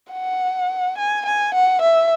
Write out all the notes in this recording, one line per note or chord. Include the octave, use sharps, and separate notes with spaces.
F#5
G#5
G#5
F#5
E5